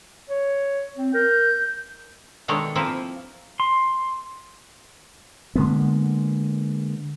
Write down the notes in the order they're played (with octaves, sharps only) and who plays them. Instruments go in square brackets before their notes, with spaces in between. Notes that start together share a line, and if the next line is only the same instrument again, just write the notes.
[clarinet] C#5
C4
[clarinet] A#4 [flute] G6
[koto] B2 D#3 G#3 A3 D4 C#5
F3 A#3 C4 E4
[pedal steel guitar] C6
[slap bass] D3 G#3 A#3 B3